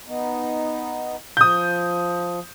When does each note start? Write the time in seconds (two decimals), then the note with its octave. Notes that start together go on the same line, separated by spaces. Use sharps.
0.07 B3 D#4
1.37 F3 D#6 G6